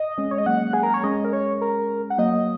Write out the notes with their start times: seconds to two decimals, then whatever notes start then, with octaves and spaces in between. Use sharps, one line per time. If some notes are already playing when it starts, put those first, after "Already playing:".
Already playing: D#5
0.18 G#3 C#4
0.31 C#5
0.38 G#3 D#5
0.46 F#3 A#3 F#5
0.73 G#4
0.83 A#4
0.94 C#5
1.04 G#3 C#4 D#5
1.25 A#4
1.33 C#5
1.61 A#4
2.10 F#5
2.19 F#3 A#3 D#5